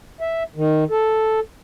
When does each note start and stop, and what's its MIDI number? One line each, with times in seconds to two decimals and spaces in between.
0.21 0.43 76
0.56 0.84 51
0.90 1.40 69